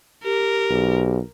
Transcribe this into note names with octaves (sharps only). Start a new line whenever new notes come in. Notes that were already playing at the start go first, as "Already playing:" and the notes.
G4 A#4
B1